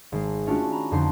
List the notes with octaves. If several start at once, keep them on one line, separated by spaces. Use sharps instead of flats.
G#1 G#3
A3 C#4 D4 F4 F#4
A#5 B5
F2 D3 C4 D#4 C6